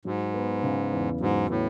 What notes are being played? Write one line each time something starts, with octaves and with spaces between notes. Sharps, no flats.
G#2 F#3
B3
C#3
E2
G#2 F#3
A2 B3